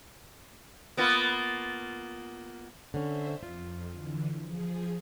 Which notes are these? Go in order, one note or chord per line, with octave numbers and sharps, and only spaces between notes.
A#3 B3 F4
D3 C#4 C5 E5
F2 F4
D3 E3
F3 G#4